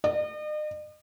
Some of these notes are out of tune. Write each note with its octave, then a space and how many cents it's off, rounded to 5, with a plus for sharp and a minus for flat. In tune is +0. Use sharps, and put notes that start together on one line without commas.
D#5 -45